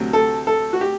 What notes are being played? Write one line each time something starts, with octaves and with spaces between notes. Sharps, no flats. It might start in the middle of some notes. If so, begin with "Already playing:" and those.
Already playing: D2 C3 F#3
A4
A4
F#4
G4